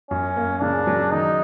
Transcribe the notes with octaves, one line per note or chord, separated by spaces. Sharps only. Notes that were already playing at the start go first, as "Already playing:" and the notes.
F#2 C#4
A#3
C#3 D4
F#3
D#3 D#4